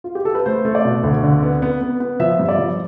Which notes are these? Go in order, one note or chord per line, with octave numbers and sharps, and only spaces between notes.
F4
G4
A4
B4
A3 C5
A3
D5
B2
D2
D3
B3
B3
B3
B3
F3 E5
G2
D5
F3